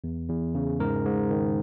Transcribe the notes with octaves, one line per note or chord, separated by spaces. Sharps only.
E2
E2
C#3
G#2 A#4
G#2
D#3